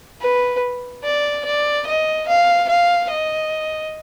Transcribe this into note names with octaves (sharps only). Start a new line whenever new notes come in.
B4
D5
D5
D#5
F5
F5
D#5